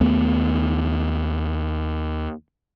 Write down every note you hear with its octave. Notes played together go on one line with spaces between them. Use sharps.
D#2 A3 B3